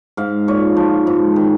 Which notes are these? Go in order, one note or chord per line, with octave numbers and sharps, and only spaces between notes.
G#2 F5
A#2 C#5
F3
G#2
D#3